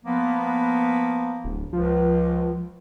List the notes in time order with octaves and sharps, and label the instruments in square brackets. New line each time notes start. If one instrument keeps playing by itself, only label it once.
[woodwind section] F3 A#3 B3
[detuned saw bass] D1
[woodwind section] C#2 [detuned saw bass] F3